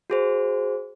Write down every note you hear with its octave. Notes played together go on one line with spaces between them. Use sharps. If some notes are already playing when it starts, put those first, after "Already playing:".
F#4 G#4 C5